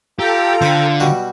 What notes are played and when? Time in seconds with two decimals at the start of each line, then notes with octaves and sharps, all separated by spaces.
0.19 F4 G4 A4 G5 A#5
0.62 D3 C5 B5
1.00 B2 G3 F#4